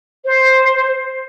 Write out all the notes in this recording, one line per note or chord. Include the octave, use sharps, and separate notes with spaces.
C5